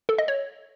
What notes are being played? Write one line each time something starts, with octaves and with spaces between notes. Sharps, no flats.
A4
D#5
C#5